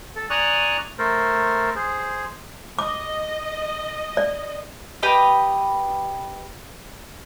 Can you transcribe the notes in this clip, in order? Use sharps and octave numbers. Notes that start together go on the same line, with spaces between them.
A4
D5 G#5 A#5 C#6 D#6 F#6
A3 A4 A#4 C5
G#4 C5
D#5 D6
D5
G4 B4 D#5